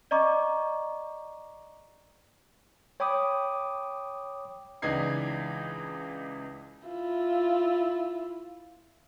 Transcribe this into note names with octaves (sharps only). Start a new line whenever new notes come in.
D5 D#5 A#5 C#6 D6
C#5 G5 B5 D6 D#6
C#2 E3 D4 D#4 G#6 C7
E4 F4